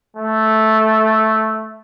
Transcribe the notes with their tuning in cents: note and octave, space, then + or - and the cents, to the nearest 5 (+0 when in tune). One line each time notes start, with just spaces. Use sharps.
A3 -5